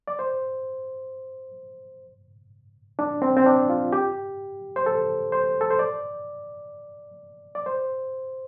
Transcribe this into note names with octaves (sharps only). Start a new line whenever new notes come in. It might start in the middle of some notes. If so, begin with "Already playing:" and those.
D5
C5
D4
C4
C4
D4
F4
G4
C5
A4
C5
A4
C5
D5
D5
C5